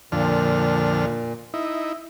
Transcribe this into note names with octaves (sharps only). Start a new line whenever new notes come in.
F2 A#2 D3 F6
D#4 E4